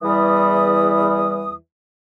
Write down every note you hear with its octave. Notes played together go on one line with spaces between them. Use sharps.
E2 E3 G3 D#6